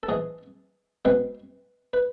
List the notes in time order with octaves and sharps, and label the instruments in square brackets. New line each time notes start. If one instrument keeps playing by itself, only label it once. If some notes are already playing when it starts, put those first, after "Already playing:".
[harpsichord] A4
G#2 E3 G#3 G#4
B2 G#3 C4 B4
B4